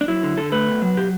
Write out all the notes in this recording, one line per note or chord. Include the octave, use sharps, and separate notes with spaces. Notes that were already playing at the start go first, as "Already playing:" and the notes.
D4
F#3 E4
D3
D3 A4
A3 B4
B2
F#3
B2 G4